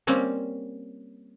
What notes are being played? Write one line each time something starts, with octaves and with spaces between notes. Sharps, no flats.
G3 A#3 C4 C#4